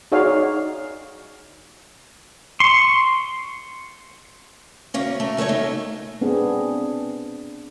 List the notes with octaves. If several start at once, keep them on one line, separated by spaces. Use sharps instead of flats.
D#4 F#4 G#4 C#5 D5 F5
C6 C#6
D2 A#3 C#4
A3 A#4
C#3 A3 A#4 C#5 E5
B2 D#3 A3 A#3 D#4
B3 C4 D4 G#4